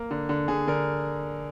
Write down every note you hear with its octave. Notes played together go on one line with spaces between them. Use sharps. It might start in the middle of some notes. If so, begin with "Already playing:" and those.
Already playing: A#3
D3
D3
D3 G#4
D3 A#4